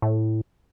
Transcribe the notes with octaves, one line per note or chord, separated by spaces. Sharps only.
A2